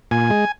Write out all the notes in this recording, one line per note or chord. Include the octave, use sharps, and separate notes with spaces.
A#2 G#5
G#3